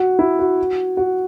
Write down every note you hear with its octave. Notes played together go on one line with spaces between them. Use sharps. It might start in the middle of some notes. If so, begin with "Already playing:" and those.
Already playing: F#4
E4
F#4
F#4